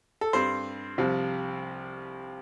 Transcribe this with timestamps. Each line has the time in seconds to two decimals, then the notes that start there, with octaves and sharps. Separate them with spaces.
0.21 A4
0.33 G2 G3 C4 C5
0.98 C2 C3 F3